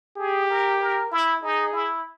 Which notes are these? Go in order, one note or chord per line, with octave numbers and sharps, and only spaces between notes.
G4 G#4
A#4
A#4
E4
D#4 G#4
E4